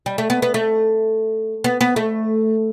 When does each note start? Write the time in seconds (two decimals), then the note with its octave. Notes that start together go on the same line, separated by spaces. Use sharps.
0.06 G3
0.18 A3
0.30 B3
0.42 B3
0.54 A3
1.64 B3
1.81 B3
1.96 A3